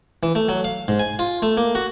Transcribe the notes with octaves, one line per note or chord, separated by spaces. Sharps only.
E3
A3
F#3
F5
G#2
G#5
F4
A3
A#3
F#4